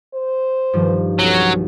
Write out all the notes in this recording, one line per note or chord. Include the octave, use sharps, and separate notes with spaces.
C5
G2 D#3 F3
B1 F#3 C#4